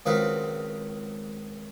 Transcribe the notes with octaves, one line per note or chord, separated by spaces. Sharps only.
C#2 D#3 F#3 C4 B4 F5